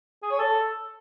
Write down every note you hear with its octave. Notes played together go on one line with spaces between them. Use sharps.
G#4
C#5
A4